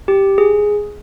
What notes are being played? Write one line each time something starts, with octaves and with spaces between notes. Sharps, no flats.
G4
G#4